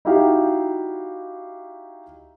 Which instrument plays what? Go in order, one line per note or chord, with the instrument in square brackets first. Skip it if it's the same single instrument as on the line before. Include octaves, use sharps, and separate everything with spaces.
[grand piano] D#4 E4 F#4 G4 F5